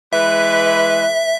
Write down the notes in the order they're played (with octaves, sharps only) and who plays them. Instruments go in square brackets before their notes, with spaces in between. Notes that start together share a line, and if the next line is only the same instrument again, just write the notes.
[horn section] E3 G#3 B4 [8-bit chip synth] E5